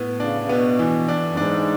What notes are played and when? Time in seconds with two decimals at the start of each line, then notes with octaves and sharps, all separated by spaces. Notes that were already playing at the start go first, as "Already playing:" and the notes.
Already playing: A2 B3
0.20 C#3 D4
0.42 C#3
0.49 B2 B3
0.79 E3
1.08 D4
1.32 F#2
1.37 G#2 D4